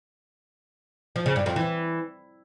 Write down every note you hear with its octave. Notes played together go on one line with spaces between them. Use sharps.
F3
C#3
G2
F2
E3